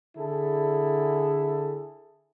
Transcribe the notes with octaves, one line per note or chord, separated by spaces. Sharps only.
D3 E4 G#4 A4